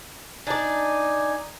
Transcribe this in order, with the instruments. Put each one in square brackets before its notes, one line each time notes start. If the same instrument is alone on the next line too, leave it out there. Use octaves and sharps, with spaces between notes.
[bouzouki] D4 D5 [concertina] D#4 G#5